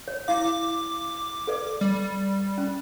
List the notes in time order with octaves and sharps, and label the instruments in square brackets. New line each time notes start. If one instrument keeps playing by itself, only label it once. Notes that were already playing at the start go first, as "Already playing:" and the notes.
[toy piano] C#5
[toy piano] E4 F5 [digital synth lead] D6
[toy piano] A4 B4 D5
[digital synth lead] G3
[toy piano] C#4